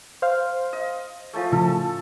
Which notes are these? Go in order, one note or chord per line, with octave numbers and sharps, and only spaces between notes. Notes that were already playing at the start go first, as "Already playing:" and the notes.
C5 F5
D#5
F3 G#3 A3
A2 C#3 F3 A4